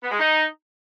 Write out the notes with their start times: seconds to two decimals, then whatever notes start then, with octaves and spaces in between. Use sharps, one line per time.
0.03 B3
0.11 G#3
0.19 D#4